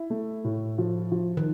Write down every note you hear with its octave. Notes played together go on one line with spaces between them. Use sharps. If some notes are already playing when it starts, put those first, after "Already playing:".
Already playing: E4
A3
A2
F3
F3
D#3